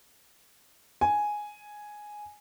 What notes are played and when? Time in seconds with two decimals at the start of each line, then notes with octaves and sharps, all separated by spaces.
1.01 G#5